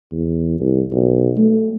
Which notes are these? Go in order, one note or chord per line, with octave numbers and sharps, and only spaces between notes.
E2
C2
B1
A3